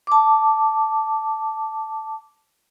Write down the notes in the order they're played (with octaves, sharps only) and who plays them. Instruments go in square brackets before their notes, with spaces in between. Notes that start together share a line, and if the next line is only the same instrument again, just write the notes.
[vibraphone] A5 D6